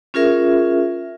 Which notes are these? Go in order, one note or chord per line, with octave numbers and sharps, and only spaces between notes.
C#4 F4 G#4 A#4 E5